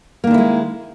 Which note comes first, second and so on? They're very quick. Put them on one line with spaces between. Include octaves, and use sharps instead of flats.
A#3 D#3 D3 E4 G#3